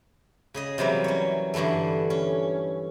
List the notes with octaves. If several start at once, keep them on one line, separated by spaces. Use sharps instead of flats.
C#3 G#4 D#5
C3 E3 F#3 G3 A#3
C#4 C#5
G2 D3 E3 G3 A3
C#4